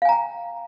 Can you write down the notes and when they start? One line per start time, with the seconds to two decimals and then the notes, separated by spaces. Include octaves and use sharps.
0.02 F5
0.05 G#5
0.09 A#5
0.12 G5